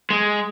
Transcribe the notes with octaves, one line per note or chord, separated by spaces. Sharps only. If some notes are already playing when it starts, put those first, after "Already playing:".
G#3